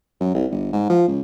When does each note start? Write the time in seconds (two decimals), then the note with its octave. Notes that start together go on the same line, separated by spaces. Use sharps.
0.20 F#2
0.34 C2
0.51 G1
0.73 G#2
0.90 F3
1.08 C#2